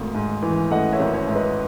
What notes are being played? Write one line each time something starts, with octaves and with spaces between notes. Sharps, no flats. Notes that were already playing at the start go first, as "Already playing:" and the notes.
Already playing: G#1 G#2 A3
G#2
E3
A3 D#5 F#5
C#5 E5
G#1
C#5 E5
G#2 E5
B4 D#5